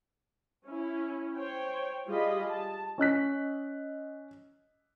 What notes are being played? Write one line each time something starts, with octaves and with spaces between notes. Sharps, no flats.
C#4 E4
C5 C#5 G5
G3 F4 G#4 D#5 B5
A5
C#4 D#5 F#6 B6